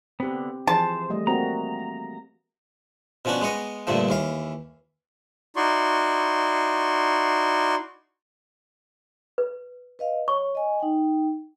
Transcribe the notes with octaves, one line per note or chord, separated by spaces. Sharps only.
D3 B3 C4 G4
E3 F3 G#4 C5 A5
G3 A3 D#5
A#3 C4 F#4 A#5
B2 F3 C#4 D4 F#4
G#3 B3 C#5 D#5
G2 A#2 D3 F3 A3
D#2 E3 F5
D#4 E4 F#4 D5 C6 C#6
B4
B4 D#5 F5
C#5 C#6
D#5 G#5
D#4 G5